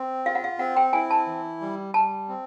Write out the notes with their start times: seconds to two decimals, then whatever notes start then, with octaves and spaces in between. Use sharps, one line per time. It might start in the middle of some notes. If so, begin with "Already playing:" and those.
Already playing: C4
0.26 F4 F5
0.35 F#5
0.44 F5
0.59 C4 F#5
0.76 G5
0.93 E4 G#5
1.11 A5
1.26 E3
1.61 G3
1.94 G3 A5
2.29 C4